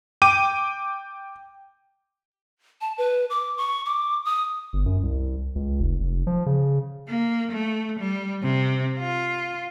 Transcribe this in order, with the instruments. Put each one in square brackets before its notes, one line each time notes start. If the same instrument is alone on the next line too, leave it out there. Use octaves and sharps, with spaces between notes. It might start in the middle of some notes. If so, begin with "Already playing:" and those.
[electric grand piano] G5 D6 D#7
[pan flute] A5
B4
D6
C#6
D6
D#6
[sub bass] G1
F#2
C2
C#2
F1
F1
F3
C#3
[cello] A#3
A3
G3
C3
F4